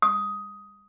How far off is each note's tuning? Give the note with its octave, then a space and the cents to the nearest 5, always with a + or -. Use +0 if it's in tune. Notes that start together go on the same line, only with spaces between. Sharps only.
D#6 +10